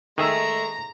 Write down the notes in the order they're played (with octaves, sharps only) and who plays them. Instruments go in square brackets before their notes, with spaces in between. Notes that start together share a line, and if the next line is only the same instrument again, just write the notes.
[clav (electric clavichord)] D#3 G#4 E5 [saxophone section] G#3 A3 [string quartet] A#5